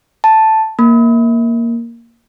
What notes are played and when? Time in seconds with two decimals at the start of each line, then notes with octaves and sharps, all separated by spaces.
0.24 A5
0.79 A#3